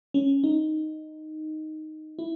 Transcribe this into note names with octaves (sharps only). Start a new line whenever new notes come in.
C#4
D#4
E4